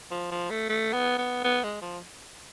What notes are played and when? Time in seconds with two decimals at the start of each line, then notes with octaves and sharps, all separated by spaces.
0.11 F3
0.31 F3
0.50 A3
0.69 A3
0.93 B3
1.18 B3
1.44 B3
1.63 G#3
1.81 F3